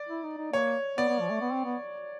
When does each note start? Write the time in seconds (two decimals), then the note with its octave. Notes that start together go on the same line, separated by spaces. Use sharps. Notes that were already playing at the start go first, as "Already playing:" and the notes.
Already playing: D5
0.09 E4
0.24 D#4
0.38 D#4
0.52 A#3 C#5
0.98 B3 D5
1.09 B3
1.20 F3
1.30 A3
1.41 B3
1.52 C4
1.65 B3